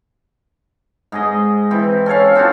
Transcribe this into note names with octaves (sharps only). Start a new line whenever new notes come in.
G#2 G#4 D#5
E3 C4
C#4 A4 C#5 F5
C4 D4 F4 F#4